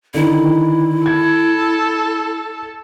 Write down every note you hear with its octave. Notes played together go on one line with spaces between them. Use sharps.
D3 D#3 E4
A4 G#6